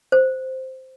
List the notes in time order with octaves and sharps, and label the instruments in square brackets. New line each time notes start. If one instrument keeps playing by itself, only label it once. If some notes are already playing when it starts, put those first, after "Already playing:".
[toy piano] C5